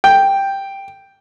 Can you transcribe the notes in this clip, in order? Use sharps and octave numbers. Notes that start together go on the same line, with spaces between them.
G5